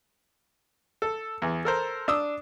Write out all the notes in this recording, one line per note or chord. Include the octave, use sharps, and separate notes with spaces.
A4
E2 G#4
A4 A#4 C5
D4 D#6 E6